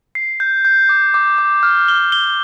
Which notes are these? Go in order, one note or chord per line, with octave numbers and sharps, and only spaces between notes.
C7
G6
G6
D6
D6
D6
F6
G7
G7